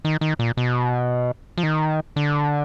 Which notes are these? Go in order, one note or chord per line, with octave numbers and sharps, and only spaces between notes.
D#3
D#3
A#2
B2
F3
D#3
D3